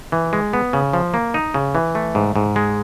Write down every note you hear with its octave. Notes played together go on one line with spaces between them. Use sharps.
E3
G#3
B3
C#3
F3
A#3
D#4
C#3
E3
A3
G#2
G#2
G#3